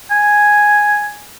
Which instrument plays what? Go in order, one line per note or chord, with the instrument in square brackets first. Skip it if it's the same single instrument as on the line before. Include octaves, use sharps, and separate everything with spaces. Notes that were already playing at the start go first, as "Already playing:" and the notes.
[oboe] G#5